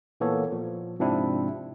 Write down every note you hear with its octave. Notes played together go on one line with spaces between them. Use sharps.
A#2 E3 A#3 B3 A4 C#5
A#2 F3
G#2 C3 F3 C4 D4 E4